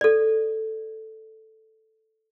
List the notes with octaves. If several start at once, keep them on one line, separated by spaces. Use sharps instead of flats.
A4 D5